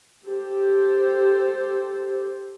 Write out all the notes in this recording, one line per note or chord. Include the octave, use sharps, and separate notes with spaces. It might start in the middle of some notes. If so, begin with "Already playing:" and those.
G4 A4 C5